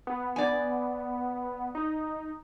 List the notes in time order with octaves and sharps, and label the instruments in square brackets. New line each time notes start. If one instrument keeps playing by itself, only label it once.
[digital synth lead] B3
[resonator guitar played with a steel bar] D5 G#5
[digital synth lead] D#4